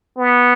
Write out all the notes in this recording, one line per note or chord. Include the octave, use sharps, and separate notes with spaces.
B3